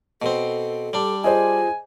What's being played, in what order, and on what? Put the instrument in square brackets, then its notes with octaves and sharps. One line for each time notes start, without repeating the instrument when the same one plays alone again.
[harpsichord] B2 C4 [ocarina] A4
[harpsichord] G3 D4
[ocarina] F4 [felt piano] G#4 C5 D#5 [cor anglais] G#5